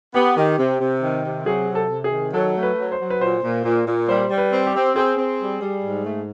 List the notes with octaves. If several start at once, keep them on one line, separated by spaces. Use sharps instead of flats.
B3 G4
D#3 G4
C3
C3
D#3
C3
F#3 G#4
C3
A4
C3
G#4
D#3
F#3 A4
A3
B4
F#3
C5
F#3
B4
A#2 C5
A#2
A#2
A#2
G3 C5
G3
B4
C4
G4
C4
C4 G#4
C4
G3
G3
G#2
A3